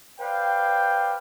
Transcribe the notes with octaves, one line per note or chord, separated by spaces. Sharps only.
B4 C5 D5 F5 G5